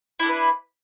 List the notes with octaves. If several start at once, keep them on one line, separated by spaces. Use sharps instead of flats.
D4 E4 A4 B4